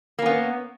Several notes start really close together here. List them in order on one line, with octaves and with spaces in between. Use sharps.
A#3 C#4 B3